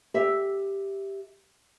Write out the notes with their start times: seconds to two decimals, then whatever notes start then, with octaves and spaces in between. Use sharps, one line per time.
0.14 G4 E5